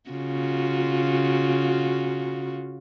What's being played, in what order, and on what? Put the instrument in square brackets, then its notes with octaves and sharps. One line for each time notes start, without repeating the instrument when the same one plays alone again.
[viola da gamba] C#3 F4 F#4